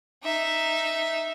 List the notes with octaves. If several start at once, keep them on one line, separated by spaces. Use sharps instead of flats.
D#4 E5